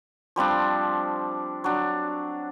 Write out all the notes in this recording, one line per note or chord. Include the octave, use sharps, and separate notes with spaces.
F3 G3 C4 D4
F#3 D4